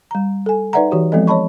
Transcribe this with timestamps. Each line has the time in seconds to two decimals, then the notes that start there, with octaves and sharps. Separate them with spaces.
0.11 G3 A#5
0.46 A4 G#5
0.73 D#4 B4 D5 E5 F#5 A#5
0.91 E3 F#4 G4
1.12 F3 G#3 B3 C4 A4 D#5
1.27 C#5 D#5 A5 B5 C#6